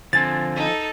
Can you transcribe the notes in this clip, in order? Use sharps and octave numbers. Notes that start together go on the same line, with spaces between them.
D3 F3 C4 G#5 A6
D#4 A4